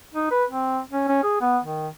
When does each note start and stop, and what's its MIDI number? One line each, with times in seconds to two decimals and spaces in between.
0.14 0.29 63
0.31 0.44 71
0.49 0.80 60
0.91 1.07 61
1.08 1.23 61
1.23 1.39 68
1.41 1.58 59
1.63 1.88 51